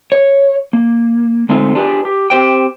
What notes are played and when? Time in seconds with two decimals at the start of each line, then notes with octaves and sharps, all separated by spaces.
0.12 C#5
0.73 A#3
1.49 D3 G#3 A3 C4 D#4 F4
1.75 D4 F4 G4 G#4 B4 D5
2.05 G4
2.30 C4 G4 C5 G5